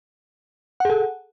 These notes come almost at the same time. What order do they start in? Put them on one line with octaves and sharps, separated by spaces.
F#5 G#4 A4